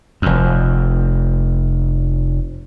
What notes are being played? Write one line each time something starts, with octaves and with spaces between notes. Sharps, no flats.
F1 F2